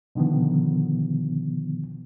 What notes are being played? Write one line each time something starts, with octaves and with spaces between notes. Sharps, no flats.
B2 D3 D#3 F3 B3